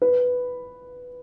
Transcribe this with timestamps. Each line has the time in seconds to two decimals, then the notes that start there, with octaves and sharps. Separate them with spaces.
0.02 B4